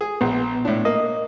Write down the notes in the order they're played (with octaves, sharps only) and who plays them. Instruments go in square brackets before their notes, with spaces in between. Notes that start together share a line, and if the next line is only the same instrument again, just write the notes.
[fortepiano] G#4
[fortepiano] A#1 [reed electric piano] B3
[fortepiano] A2 D4
[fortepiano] A#3 [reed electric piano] D#5